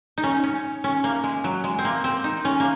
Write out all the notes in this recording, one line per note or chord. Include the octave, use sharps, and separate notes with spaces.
D#4
C#4
C#4
C#4
A#3
G#3
F#3
G#3
C4
A#3
C4
D#4
C#4
A#3